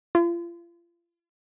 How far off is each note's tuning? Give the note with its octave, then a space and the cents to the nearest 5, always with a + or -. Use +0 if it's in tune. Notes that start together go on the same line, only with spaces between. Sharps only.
F4 -35